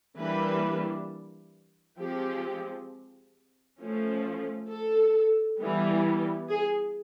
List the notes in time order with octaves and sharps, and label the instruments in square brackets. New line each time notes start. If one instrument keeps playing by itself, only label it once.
[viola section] E3 G3 A#3 D4 B4
F3 G#3 C4 G4
F3 A3 C#4
A4
E3 G3 B3
G#4